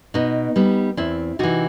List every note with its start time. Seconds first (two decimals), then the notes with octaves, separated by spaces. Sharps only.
0.14 B2 B3 D#4
0.56 G3 B3
0.97 E2 C4 E4
1.39 C3 E3 D#4 F#4